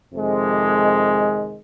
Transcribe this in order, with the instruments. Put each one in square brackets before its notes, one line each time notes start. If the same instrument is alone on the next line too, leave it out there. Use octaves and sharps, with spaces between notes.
[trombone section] F2 C3 D#3 G#3